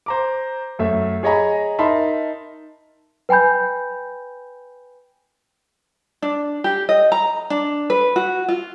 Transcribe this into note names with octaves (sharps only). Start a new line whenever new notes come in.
C5 A#5 D6
F#2 A3 E5
G#4 C#5 D#5 G#5 A#5 B5
D#4 A#4 E5 A5 B5 C6
B4 G5 G#5 B5 G6
D4
G4
D#5
A#5
D4
B4
F#4
F4